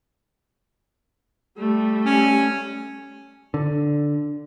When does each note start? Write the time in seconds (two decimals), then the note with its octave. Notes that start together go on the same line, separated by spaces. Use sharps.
1.58 G3 A3
2.06 C#4
3.54 D3